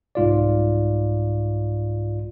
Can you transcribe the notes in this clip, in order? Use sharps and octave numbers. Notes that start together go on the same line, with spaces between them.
C2 G#2 F4 D5